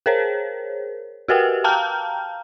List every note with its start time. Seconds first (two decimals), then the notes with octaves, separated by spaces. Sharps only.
0.06 G#4 A#4 C5 C#5
1.28 F#4 G4 A#4 B4 F#5 G5
1.64 F5 G5 A5 A#5 F6 G6